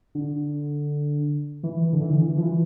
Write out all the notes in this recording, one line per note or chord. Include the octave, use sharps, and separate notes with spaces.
D3
E3
D3
E3
D3
E3
F3
E3